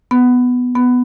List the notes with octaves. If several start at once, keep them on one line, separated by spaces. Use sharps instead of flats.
B3
B3